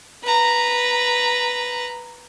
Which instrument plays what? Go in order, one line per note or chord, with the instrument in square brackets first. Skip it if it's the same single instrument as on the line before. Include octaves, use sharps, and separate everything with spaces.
[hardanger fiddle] B4 A#5